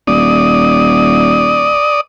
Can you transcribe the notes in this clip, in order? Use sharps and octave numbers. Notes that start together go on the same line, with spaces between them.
D#1 D5 D#6